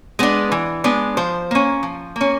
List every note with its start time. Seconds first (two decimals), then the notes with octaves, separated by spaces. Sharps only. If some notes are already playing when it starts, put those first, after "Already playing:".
0.19 G#3 B3 D4
0.52 E3
0.84 G#3 B3 D4
1.17 F3 C5
1.51 A#3 C#4
1.83 F3
2.16 A#3 C#4